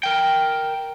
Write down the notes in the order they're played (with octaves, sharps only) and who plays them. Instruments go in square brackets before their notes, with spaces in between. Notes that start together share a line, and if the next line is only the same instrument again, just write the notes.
[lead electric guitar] A#4 G5